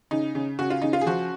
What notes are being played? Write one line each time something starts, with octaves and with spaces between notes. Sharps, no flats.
C#3 D#4
C#3
C#3 F#4
F4
C#3 D#4
F4
G#4
F3 F#4